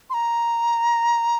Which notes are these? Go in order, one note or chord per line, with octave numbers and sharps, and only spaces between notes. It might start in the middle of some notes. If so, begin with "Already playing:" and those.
C6
A#5